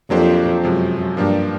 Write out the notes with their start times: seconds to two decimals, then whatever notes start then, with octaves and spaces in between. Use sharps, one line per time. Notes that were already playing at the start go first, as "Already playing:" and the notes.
0.10 F2 F#3 A#3 D4 G4 C5
0.63 F#2 C3 F3 G#3
1.17 G2 F3 A#3 D4 G4 A#4